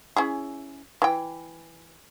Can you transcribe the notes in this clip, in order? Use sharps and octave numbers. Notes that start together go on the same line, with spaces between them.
C#4 E4 G#4
E3 G5